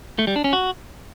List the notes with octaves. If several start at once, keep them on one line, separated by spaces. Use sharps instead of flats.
A3
G3
D4
C#4
F#4